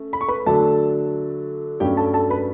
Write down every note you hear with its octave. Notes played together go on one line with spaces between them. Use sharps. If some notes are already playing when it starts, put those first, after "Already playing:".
Already playing: A3 C#4
B5
C#6
B4 B5
D3 F#3 A3 D4 A4 A5
G2 F#3 A3 C#4 G4 G5
A4 A5
A4 A5
B4 B5